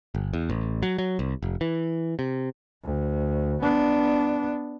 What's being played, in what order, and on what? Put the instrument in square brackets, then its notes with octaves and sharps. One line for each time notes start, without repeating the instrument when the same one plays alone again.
[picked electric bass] G1
E2
A1
F#3
F#3
C2
F1
E3
C3
[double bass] D2
B3 D4